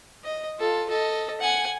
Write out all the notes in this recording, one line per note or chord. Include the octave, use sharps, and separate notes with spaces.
D#5
F4 A4
A4 D#5
F#5 G#5